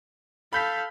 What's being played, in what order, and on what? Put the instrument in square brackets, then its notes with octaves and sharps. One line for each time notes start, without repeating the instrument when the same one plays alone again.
[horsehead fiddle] A4 F5 [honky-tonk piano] B5 G6 B6